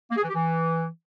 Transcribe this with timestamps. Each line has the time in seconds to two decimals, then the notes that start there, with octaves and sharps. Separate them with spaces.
0.11 A#3
0.17 G#4
0.23 E3
0.29 G4
0.35 E3